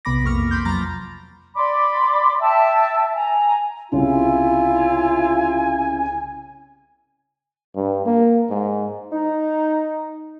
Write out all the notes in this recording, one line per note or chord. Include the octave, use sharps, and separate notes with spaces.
B1 C3 B3 B5 D6 A#6
F2 A#3 C#6 F6
E2
B5 C6 D6 G6
F3 F#3 A#5 F6 A6 A#6
D5 B5 C6 D6
E5 G5 A5 E6
G#5 A#5
C2 C#3 E4 F4 G#5
G2
A#3
G#2
D#4